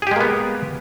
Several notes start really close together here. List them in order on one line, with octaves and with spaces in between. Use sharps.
G#4 G4 G#3 A#3 B3